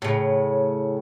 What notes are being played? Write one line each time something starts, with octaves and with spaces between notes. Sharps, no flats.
A2 C#3